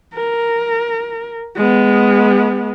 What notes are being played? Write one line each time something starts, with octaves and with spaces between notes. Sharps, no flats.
A#4
G#3 B3